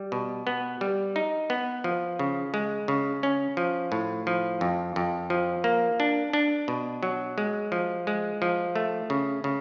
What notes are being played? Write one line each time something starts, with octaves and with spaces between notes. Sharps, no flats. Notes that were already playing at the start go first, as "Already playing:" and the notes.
Already playing: G3
B2
B3
G3
D#4
B3
F3
C#3
G#3
C#3
C#4
F3
A2
F3
F2
F2
F3
A#3
D4
D4
B2
F#3
G#3
F3
G#3
F3
A3
C#3
C#3